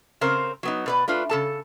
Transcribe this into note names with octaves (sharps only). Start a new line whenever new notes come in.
C#3 C4 A#4 C5
F#3 B3 D#4
B2 B4 D5
A3 D4 F4 B4
C#3 A4 A5